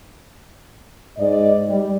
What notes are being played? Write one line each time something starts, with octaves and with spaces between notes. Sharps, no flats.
G#2 D5 D#5
G3